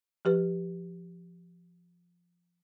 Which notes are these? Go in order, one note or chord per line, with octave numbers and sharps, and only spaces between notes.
F3 G4 B4